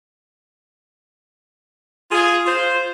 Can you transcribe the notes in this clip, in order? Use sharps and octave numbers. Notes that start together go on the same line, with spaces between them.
F4 G#4
F4 C5